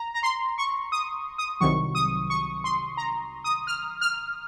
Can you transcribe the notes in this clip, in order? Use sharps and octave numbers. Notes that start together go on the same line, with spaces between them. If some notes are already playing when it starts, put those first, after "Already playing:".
Already playing: A#5
A#5
C6
C#6
D#6
D#6
C2 C3 D#3 F#3 C#6
D#6
C#6
C6
A#5
D#6
F6
F6